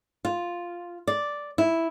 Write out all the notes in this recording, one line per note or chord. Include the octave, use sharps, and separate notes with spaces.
F4
D5
E4